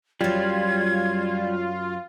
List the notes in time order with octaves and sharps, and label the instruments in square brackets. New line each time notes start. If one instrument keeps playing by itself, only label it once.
[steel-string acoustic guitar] F#2 F#3 [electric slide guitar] G3 [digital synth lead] F4 [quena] G#6